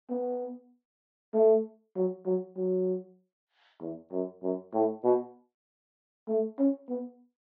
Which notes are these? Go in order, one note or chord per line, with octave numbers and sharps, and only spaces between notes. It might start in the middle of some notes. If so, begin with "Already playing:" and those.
B3
A3
F#3
F#3
F#3
E2
F#2
F#2
A2
B2
A3
C#4
B3